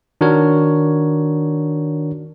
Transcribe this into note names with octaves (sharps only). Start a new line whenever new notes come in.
D#3 D4 F#4 A#4 C#5